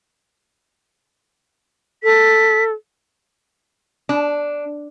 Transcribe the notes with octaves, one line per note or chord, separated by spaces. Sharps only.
A4 B6
D4